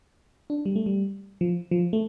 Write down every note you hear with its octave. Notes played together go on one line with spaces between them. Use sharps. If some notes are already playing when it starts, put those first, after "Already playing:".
D4
G3
A3
G3
F3
F3
A3